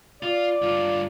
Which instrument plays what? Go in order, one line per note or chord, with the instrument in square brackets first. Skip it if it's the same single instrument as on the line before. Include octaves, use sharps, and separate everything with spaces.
[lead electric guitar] F4 [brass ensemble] D5
[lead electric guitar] G2 F4